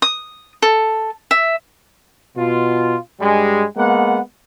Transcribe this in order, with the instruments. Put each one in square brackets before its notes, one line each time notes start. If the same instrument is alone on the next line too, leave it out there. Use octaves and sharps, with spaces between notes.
[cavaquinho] D#6
A4
E5
[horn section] B2 F4
G2 G3 G#3
G#3 A#3 B3 F#5